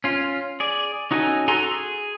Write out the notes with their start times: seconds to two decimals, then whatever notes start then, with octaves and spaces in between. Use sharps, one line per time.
0.04 C#4 F4
0.60 G#4 D5
1.11 C#4 D#4 F#4 A4 G#5
1.48 F#4 A4 G#5 A#5 C6
1.71 G#4